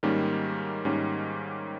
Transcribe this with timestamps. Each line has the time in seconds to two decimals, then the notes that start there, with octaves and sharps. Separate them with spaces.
0.03 G#2 D#3 G3 A#3 C#4
0.85 G#2 D#3 G3 A#3 C#4